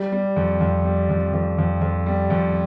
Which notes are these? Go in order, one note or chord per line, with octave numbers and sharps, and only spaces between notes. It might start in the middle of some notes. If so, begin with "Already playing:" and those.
Already playing: G3
G3
F2
F2
G3
F2
F2
F2
F2
G3
F2